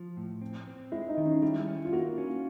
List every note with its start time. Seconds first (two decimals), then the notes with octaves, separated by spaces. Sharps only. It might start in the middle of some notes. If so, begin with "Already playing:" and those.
Already playing: F3
0.17 A2
0.42 C4
0.67 C4
0.92 G#3 E4
1.08 D#4
1.17 D#3
1.26 C#4
1.42 G3 E4
1.67 C#4
1.85 F4
1.93 A#3 F#4
2.18 C#4